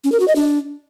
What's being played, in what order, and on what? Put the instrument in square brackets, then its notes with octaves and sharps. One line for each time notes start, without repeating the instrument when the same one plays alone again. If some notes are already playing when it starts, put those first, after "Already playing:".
[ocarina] C#4
A#4
F#4
D#5
D4